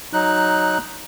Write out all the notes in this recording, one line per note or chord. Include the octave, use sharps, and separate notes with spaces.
F#3 D#4 F#6